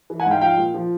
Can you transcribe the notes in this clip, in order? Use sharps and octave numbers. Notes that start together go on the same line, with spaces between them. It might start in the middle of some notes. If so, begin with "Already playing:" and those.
E3
F#5 G#5
G#2
F5 G5
F3 F5 G5
A#2
F3